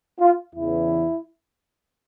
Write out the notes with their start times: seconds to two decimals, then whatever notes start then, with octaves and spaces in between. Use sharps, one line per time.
0.20 F4
0.55 E2 C#3 E3 E4